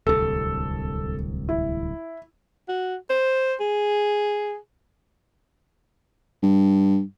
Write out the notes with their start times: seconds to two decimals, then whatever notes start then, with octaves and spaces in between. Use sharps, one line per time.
0.07 D1 C2 A4
1.49 E4
2.68 F#4
3.10 C5
3.60 G#4
6.42 G2